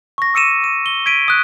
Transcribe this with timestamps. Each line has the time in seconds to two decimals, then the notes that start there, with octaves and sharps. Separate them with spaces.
0.18 C#6 A#6
0.34 D6 E6 C#7 D#7 E7
0.64 D#7
0.86 G7
1.06 G#6 B6 D7 D#7
1.28 D#6 F#6